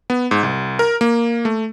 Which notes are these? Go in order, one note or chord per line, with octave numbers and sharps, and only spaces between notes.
B3
G#2
C2
A#4
A#3
A3